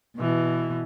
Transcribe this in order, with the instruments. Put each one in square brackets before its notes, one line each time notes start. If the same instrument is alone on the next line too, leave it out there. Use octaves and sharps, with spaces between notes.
[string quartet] B2 E3